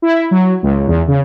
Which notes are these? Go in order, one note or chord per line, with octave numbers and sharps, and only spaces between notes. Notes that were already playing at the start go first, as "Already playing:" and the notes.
E4
F#3
C#2
E2
C#3